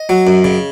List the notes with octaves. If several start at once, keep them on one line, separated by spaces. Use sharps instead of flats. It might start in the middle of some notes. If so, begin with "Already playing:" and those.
Already playing: D#5
F#3
F#2
C#3